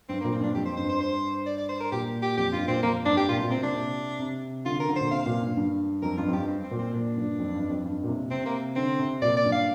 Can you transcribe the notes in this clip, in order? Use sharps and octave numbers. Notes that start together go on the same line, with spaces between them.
G2 C4
A#3
A#2
C4
G2 D4
F2 G4
C5
G2 C5
C5
C5
D5
D5
C5
A#4
A#2 G4
G4
F2 G4
G2 F4
A#2 C4
F2 A#3
G2 D4
G4
A#2 F4
C3
A#2
C3 C4
A#2
D4
C3
C3
D3 F4
A#4
D3
A#2 C5
C3 F5
A#2
G2
G2
F2 A#4
G2 F4
F2
G2 G4
C4
C4
A#2
C4
A#2 D4
G2
F2
G2
F2
G2
A#2
C3
C3 C4
A#3
D3 C4
C3
A#2 D5
D5
G2
F5